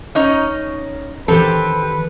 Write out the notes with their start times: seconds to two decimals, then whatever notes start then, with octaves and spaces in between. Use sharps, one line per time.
0.15 C#4 D#4 C#5
1.28 D#3 E3 C4 G4 A4 B4